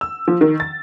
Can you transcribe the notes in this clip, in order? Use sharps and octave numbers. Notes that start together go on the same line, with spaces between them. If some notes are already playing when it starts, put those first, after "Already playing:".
E6
F3
D#3
A6